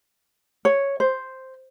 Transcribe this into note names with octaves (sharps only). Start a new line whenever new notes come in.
C#5
C5